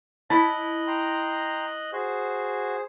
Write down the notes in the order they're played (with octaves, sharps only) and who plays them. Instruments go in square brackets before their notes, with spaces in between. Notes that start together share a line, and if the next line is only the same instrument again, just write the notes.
[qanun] E4 [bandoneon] D#5 F#6 [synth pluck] A5 B5
[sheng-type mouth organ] G5 A#5 C6
[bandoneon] F#4 [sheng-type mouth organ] G#4 C5